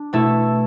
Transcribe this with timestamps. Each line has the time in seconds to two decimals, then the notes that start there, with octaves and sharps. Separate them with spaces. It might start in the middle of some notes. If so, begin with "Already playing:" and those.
Already playing: D4
0.13 B2 A3 E4 A4